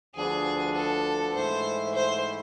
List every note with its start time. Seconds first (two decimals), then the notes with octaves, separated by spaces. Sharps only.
0.15 D2 D3 F3 B3 D4 G#4
0.75 A4
1.34 G#2 E3 A3 E4 C5
1.94 C5